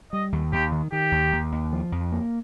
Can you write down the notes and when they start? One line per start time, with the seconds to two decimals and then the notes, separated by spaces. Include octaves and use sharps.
0.12 G3 D#5
0.32 D#2
0.52 D#2 G4
0.72 D#3
0.92 D#3 G4
1.12 D#2
1.33 D#2
1.52 D#2
1.73 F3
1.92 F2
2.12 A#3